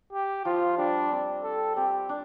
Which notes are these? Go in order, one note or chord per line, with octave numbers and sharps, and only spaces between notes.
G4
F3 F4
G3 D4
C4
A4
C4 G4
D4